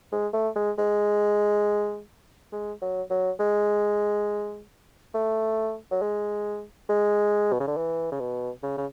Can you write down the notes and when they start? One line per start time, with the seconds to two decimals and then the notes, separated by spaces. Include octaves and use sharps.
0.12 G#3
0.33 A3
0.56 G#3
0.78 G#3
2.52 G#3
2.82 F#3
3.10 F#3
3.40 G#3
5.14 A3
5.91 F#3
6.02 G#3
6.89 G#3
7.52 B2
7.60 C#3
7.68 D3
7.77 E3
8.12 C#3
8.20 B2
8.63 C#3
8.77 C#3